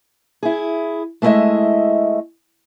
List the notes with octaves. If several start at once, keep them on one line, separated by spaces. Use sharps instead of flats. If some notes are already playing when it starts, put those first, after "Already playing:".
E4 G#4
G#3 A3 B3 E4 D#5 E5